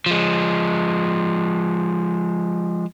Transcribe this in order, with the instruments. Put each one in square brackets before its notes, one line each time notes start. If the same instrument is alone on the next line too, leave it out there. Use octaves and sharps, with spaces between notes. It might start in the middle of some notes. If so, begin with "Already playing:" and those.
[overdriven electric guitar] F3 G#3